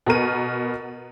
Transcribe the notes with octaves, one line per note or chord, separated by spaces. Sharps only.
B2 B3 A#4 D#7